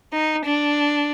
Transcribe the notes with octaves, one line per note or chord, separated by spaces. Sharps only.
D#4
D4